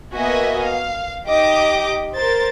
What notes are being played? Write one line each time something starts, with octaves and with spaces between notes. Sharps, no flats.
A#3 B3 F#4 D#5 E5 G#5
F5
D#4 G4 D#5 D6
A#4 C5 A6